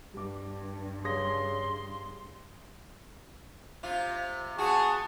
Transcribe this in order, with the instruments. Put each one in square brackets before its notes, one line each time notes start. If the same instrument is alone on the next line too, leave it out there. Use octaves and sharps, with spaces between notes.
[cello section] G2 [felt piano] G4 D6
[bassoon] C#3 [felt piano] G3 D#6 A#6 [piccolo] C6
[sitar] C3 F4
[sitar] B3 F#4 [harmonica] G#4 C#6 [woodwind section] F#5 A5